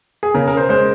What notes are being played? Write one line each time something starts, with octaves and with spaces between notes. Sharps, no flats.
G#4
C#3 A#4
A#4
C5
G#3 C5